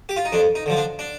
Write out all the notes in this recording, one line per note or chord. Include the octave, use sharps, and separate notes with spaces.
G4
F4
D#4
F2 D4
D#4
D3 F3
D4
D4